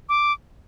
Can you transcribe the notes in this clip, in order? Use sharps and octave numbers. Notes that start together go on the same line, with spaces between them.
D6